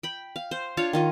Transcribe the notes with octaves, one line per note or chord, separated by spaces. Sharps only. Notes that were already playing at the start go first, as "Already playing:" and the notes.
G5 B5
F5
C5
D4 F4 C#5 F5
D#3 F4 D#5